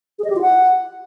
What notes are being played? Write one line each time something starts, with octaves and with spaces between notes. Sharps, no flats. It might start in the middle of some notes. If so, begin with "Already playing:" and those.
G#4
D#5
G4
F4
F#5